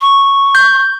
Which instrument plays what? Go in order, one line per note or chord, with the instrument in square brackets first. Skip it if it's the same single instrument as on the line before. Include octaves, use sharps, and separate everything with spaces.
[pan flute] C#6
[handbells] G6